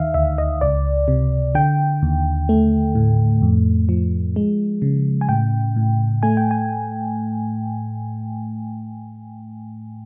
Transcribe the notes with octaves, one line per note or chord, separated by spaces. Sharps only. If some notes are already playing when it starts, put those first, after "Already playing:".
Already playing: D#2 D#3 E5 F5
D2 E5
D#5
C#2 D5
C3
D3 G5
D#2
A3
A2
F2
F3
G#3
C#3
G#5
A2 G5
A2
A3 G#5
G5
G#5